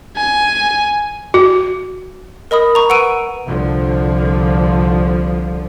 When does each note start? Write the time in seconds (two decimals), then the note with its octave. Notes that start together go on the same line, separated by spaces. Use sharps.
0.17 G#5
1.34 F#4
2.51 A#4 D#5 B5 D#6
2.75 A#5 C#6
2.89 B4 F#5 E6 D7 D#7
3.46 C2 D3 F3